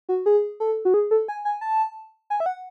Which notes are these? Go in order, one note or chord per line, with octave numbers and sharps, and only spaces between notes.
F#4
G#4
A4
F#4
G#4
A4
G#5
G#5
A5
G#5
E5
F#5